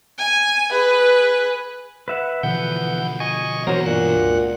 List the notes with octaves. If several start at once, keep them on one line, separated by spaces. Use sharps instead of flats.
G#5
G#4 B4
B4 E5 F#5
B2 D3 E3 F3 B3 F#5 G6
D#5 G#5 C#6
B2 E3 F#3 A#3 F#4 A#4 C5 A#5
G2 A#2 F#5
C#2